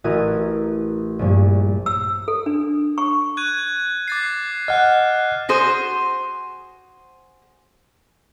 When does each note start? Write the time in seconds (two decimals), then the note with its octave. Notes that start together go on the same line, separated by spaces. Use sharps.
0.04 A1 E4 F#4 A#4 D#6 G#6
1.19 A#1 G2
1.86 E6
2.28 A4
2.46 D4
2.98 C#6
3.37 F#6 G#6 D#7
4.08 D6 A6 C7
4.68 D#5 F#5 F6 F#6
5.49 F#4 G#4 C5